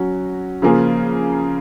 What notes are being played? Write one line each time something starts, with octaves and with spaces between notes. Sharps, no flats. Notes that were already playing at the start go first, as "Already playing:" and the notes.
Already playing: F#3 C#4 F#4
C#3 F3 A#3 F4 G#4